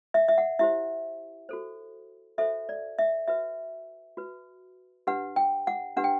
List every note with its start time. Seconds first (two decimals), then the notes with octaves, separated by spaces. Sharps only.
0.14 E5
0.29 E5
0.38 F#5
0.59 E4 G4 C5 E5
1.49 F#4 A4 C5
2.38 F#4 A4 C5 E5
2.69 D5
2.98 E5
3.28 F#4 B4 E5
4.17 F#4 B4
5.07 D4 G4 B4 F#5
5.36 G5
5.67 F#5
5.97 D4 G4 B4 F#5
6.04 G5